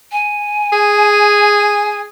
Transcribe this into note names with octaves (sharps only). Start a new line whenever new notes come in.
G#5
G#4